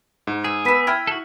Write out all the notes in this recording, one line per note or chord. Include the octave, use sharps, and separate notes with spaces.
G#2
G#4 E6
B3 B4 E6 B6 D#7
E4 G5 B5 F6
F#4 A4